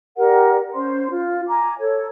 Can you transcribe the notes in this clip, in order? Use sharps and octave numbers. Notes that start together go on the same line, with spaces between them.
G4 A#4 D5 F#5
C#4 C5 C6
F4
G#5 A#5 D6
A4 C#5